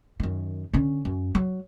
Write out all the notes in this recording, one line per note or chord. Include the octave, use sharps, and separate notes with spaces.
F#2 D#3
D3 C#4
F#2
F#3